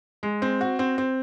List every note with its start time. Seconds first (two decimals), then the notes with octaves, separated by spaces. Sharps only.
0.23 G#3
0.42 C4
0.61 F#4
0.79 C4
0.98 C4